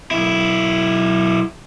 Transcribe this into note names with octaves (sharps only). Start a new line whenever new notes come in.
B1 E4